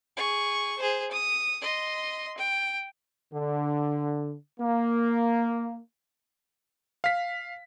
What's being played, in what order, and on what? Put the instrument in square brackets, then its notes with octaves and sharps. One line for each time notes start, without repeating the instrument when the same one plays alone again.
[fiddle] G#4 C#6
G#4 C5
D#6
D#5 C6
G5
[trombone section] D3
A#3
[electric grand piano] F5 B6